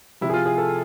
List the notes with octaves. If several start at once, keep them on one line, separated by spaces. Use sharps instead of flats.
C3 F3 E4
G#4
F4
G#4
A4